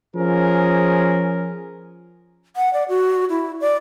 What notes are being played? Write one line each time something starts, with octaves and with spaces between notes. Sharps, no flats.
F3 C#4 G#4 A#4
F#5
D5
F#4
E4
D5